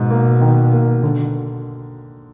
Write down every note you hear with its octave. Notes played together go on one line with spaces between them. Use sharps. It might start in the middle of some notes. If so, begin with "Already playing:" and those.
Already playing: G#2 B2
A#3
D#3
A#3
D3